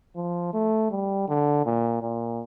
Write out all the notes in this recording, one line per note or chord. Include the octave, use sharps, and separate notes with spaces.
F3
A3
G3
D3
A#2
A#2